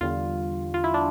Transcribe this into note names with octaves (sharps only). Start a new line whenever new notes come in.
E2 D3 G3 F4
F4
E4
D4